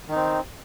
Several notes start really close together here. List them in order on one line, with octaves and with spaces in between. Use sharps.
D#3 D#4 C4